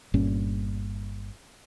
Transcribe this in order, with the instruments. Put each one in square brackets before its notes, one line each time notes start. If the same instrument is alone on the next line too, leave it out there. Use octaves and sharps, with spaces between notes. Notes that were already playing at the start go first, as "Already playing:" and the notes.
[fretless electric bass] G1 G2 A#2 C#4